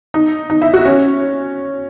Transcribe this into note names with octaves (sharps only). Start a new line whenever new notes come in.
D#4
D#4
E4
F#4
C#4